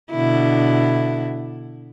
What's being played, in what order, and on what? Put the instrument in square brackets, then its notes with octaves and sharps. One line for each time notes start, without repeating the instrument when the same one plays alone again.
[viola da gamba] B2 D3 E4